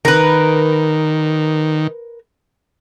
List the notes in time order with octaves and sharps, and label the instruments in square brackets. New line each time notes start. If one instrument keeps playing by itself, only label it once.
[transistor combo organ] D#3 [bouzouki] A#4 B4